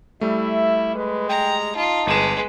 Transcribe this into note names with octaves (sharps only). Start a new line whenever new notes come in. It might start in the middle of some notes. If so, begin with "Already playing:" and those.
G3 A3 E4 E5
G#3 B4
G5 A#5
D#4 F4 A5
G1 G#3 B4 D#7 E7